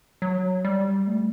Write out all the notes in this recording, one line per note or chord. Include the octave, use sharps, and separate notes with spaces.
F#3
G3
A3